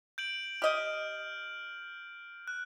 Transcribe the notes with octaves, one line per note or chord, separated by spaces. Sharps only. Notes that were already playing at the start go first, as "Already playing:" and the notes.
G6 D7 F#7
G4 D#5 F6 G6
F#6